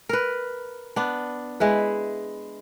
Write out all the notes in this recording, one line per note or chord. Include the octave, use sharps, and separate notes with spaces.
A#4 B4
B3 D4
G#3 E4 B4